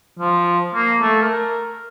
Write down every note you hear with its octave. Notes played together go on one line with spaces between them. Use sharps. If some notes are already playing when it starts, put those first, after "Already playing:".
F3
A#3
A3
A#4